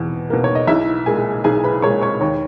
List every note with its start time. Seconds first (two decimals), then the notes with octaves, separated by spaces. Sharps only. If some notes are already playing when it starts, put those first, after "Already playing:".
Already playing: E2 B2
0.30 B2 A#3
0.44 C#5
0.55 D#5
0.67 B1 E4 E5
1.06 A#2 G#3 G#4 G#5
1.44 B1 G#4 G#5
1.63 B4 B5
1.82 A#2 G#3 C#5 C#6
2.02 C#5 C#6
2.21 D#2 C#5 C#6